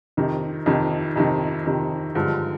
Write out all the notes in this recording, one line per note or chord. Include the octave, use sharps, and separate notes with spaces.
F2 C3 D#3
F2 C3 D#3
F2 C3 D#3
F2 C3 D#3
G2 D3 F3 G#3